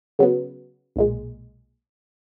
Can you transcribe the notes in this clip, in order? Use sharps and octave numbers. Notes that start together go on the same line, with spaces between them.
C#3 F#3 B3
B1 A#2 G#3